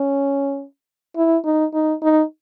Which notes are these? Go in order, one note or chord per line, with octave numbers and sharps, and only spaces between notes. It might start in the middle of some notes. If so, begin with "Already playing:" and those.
Already playing: C#4
E4
D#4
D#4
D#4